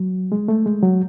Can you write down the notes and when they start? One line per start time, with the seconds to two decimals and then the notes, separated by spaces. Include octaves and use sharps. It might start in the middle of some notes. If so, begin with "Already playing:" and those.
Already playing: F#3
0.32 G#3
0.48 A3
0.66 G#3
0.83 F#3